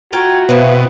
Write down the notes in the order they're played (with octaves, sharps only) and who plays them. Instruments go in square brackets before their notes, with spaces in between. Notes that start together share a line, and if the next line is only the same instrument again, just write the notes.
[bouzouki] A3 F4 G5 [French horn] F#4 [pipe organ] A#5 G#6
[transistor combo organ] B2 [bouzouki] B3 C4 E4 [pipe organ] E5 F5